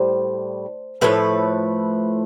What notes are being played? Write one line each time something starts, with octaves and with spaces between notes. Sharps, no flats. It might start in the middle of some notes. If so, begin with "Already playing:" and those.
Already playing: A2 G3 C5
A2 F3 A3 B4